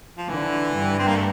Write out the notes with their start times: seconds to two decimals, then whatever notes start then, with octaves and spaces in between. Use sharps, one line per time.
0.17 F3
0.29 D3 E3
0.77 G2
0.99 C4
1.08 A#3
1.16 A3